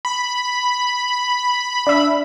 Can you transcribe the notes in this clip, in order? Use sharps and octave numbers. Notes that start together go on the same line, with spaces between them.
B5
D4 E5